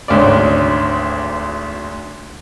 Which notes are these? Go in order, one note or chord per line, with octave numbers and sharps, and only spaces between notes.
G#1 D2 C#4 D5